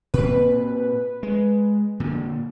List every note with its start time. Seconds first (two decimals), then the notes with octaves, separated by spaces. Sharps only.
0.14 A#2 C4 B4
1.23 G#3
2.00 A#2 D3